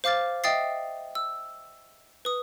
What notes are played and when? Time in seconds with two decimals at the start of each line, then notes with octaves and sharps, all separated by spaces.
0.04 C5 F5 D6 F6 A6
0.44 D#5 E5 G5 D#6 A6 C7
1.15 E6
2.25 B4 D#6